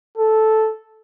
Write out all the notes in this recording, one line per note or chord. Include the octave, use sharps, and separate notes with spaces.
A4